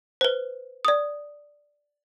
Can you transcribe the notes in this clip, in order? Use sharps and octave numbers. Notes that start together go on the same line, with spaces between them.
B4 C5
D5 D#6